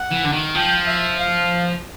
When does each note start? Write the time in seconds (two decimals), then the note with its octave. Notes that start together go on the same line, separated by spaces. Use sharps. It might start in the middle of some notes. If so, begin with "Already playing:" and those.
Already playing: F#5
0.11 E3
0.24 D3
0.32 D#3
0.54 F3 G5
0.87 E5
1.18 F5